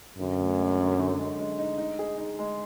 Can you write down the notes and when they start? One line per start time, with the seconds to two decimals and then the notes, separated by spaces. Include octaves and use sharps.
0.18 F#2 D3
0.39 D2
0.58 G#3
0.79 D3
0.98 D3
1.19 G#3
1.39 G#3
1.58 D#4
1.78 D#4
1.99 G#4
2.18 D#4
2.39 G#3